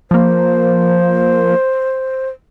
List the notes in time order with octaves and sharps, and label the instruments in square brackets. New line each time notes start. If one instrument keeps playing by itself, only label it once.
[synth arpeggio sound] F3 A#3 [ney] C5